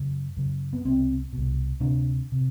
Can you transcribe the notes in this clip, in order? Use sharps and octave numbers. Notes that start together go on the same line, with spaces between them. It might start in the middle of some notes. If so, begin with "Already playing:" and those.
Already playing: F#2 C#3
F#2 C#3
B3
C2 B2 C4
C2 B2
D2 C3 D4
C3